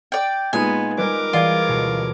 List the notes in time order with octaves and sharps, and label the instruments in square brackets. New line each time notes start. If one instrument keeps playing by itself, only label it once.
[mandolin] D5 G5
[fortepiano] A#2 G#3 D#4 [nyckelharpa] B3 [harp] F4 [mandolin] G#5
[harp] G3 G#3 [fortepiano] D#4 B4 [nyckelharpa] A#4 D6
[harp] E3 G#4 G#6 [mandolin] F4 [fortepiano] D5
[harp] D2 B2 C#5